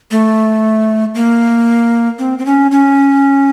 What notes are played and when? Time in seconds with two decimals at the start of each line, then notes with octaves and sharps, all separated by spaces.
0.11 A3
1.15 A#3
2.19 C4
2.39 C4
2.46 C#4
2.71 C#4